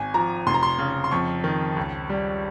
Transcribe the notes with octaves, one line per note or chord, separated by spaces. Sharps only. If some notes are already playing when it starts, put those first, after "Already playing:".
Already playing: G#1 G#5
F3 A#5
F1 C6
A#5
C6
C#3
C6
F2 C#6
D#3
C#2
G3